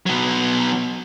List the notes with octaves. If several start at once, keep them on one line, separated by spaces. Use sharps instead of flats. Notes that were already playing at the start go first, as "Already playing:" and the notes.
B2 F#3